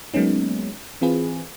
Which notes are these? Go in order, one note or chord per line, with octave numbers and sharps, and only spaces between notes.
F#3 G#3 A#3 B3 C#4 D#4
E3 C4 F4 G#4 B4